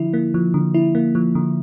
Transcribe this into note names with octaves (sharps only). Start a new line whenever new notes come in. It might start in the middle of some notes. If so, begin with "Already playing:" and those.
Already playing: D3 F3 E4
A#3
F3
D3
E4
A#3
F3
D3